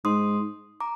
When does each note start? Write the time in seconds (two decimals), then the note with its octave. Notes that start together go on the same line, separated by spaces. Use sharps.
0.05 G#2 C6 D#6
0.80 A#5 D6